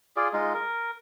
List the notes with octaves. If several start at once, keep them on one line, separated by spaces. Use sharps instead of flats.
F4 G#4 D5
G#3 D#4 F4
A#4